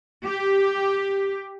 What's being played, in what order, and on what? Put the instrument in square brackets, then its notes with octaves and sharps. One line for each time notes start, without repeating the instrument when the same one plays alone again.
[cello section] G4